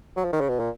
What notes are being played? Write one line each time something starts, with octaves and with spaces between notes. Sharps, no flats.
F#3
F3
D#3
C#3
B2
A#2